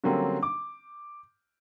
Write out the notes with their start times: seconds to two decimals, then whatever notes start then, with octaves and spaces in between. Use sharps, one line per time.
0.04 D3 F#3 G3 A#3 C4 C#4
0.43 D6